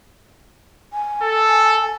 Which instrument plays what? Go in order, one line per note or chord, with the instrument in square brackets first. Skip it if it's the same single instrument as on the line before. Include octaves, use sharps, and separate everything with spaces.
[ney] G#5
[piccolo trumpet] A4